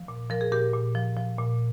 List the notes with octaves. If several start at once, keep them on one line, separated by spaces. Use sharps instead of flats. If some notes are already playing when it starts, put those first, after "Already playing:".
Already playing: F3
A#2
F3 A#4
G#4
A#2 G4 A#4
A#2
F3
F3
A#2